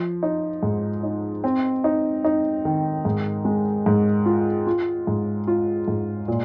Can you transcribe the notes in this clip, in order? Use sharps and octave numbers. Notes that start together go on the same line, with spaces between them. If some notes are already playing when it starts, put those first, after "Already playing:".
Already playing: F3
D#4
G#2
D#4
C4
D#4
D#4
D#3
G#2
G#3
G#2
F4
F4
G#2
F4
G#2
A#2